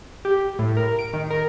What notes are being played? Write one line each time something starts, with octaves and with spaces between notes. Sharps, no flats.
G4
A2
A#4
D7
D#3
A#4